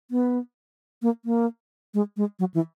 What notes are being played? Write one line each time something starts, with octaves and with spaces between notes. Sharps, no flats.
B3
A#3
A#3
G#3
G#3
F#3
E3